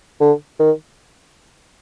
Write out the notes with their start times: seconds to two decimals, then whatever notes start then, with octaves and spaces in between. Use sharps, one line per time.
0.21 D3
0.59 D#3